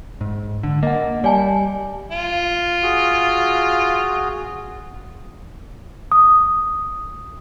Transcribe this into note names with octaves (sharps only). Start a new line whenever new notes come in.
G#2
D3
A#3 D#5 F#5
G3 D5 G#5 A5
F4
F#4 G#4
D#6